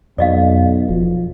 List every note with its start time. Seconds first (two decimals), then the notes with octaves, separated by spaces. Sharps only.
0.18 B1 F2 D5 D#5 F5
0.89 E1 F3